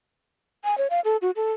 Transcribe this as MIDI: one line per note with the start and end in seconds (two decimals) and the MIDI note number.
0.64 0.77 80
0.78 0.87 73
0.90 1.00 77
1.05 1.17 69
1.22 1.31 66
1.36 1.53 69